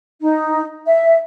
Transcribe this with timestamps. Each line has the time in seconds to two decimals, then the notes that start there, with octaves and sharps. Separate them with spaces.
0.21 D#4
0.87 E5